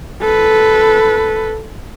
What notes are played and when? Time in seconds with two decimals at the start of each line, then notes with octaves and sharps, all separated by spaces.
0.21 A4 B4